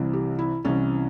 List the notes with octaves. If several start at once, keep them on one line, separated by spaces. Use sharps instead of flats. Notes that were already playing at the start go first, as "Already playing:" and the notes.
Already playing: C2 C3 E3
G4
E4
C2 C3 E3 C#4